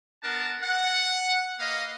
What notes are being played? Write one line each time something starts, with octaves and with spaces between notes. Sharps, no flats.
B3 D4 A#4 F#5 A5
F#5
A#3 B4 D#5 F5